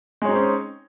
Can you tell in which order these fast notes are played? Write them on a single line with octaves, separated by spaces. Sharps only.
G#3 C#5 D#4 C4 C#4